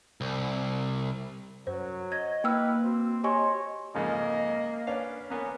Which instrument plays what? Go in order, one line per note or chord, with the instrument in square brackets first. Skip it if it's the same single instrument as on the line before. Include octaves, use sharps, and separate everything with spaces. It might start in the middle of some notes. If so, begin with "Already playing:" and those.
[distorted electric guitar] C2
[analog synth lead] F#2 [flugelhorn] F#3 [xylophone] C5
[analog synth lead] D#5 [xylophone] G#6
[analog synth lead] A#3 [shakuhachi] E4 [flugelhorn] B4 [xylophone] G5 E6 F6
[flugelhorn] C4 [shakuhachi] F#4
[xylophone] G4 G#5 C#6 [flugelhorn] C#5 [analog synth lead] D#5 [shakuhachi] C6
[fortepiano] F2 G#2 C#3 [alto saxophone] A#3 [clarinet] D#5
[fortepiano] C#4 D4 F5 [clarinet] B4
[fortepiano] A#3 B3 [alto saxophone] C#4